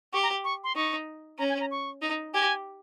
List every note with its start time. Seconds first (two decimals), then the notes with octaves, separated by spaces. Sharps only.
0.13 G4 C#6
0.23 A#5
0.44 C#6
0.64 C6
0.75 D#4 C#6
1.39 C#4 A#5
1.49 G#5
1.61 A#5
1.71 C#6
2.02 D#4
2.34 G4 G#5